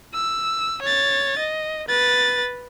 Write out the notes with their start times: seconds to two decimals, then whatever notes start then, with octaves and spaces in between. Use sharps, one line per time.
0.14 E6
0.82 C#5 A6
1.39 D#5
1.88 B4 A6